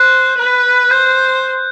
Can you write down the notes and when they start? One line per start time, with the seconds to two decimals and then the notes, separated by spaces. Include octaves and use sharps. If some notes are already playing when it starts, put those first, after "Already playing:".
Already playing: C5 F#6
0.38 B4
0.91 C5 G6